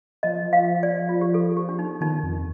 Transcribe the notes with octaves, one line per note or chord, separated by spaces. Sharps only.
F3 D#5
F5
D5
F4
G4
A4
G4
D4
D#4
D#3 D#4
F2